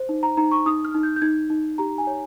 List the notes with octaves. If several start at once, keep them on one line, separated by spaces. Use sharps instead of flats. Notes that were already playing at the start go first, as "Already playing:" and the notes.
Already playing: C5
D#4
A#5
D#4 A#5
C#6
D#4 D#6
F6
D#4
G6
G6
D#4 G#6
D#4
G4 A#5
G#5
C#5